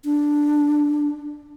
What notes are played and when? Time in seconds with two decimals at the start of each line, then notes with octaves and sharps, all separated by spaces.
0.05 D4